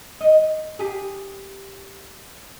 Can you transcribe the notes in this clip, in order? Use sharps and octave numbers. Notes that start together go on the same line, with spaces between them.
D#5
G4 G#4